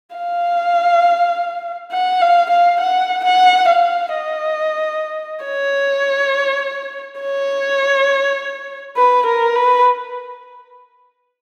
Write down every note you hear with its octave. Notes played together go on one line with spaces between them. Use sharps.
F5
F#5
F5
F5
F#5
F#5
F5
D#5
C#5
C#5
B4
A#4
B4